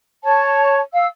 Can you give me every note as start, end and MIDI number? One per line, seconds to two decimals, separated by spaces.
0.24 0.80 73
0.24 0.80 81
0.92 1.06 77
0.92 1.06 88